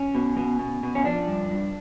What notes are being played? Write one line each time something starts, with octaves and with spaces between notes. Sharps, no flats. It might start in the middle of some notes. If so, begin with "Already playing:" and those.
Already playing: C#4
B2
B2
B2
B2
C#4
F3 D4
G2
G2